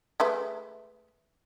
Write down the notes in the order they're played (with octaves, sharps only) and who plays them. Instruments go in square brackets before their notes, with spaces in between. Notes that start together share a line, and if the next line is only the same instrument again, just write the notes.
[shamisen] G#3 A3 B4